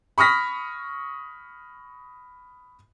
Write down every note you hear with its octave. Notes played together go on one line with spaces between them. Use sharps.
B5 C#6 D#6 F6 A#6 B6